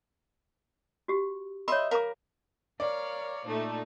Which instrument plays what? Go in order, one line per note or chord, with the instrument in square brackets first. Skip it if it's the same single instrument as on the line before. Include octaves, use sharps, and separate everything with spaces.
[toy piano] F#4 G4
[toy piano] C#5 B5 [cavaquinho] D#5 E5 C6
[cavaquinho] A#4 [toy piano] F5 A#5 D6
[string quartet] A#4 C#5 F5 [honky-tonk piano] D5
[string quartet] A#2 D#4 [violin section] A3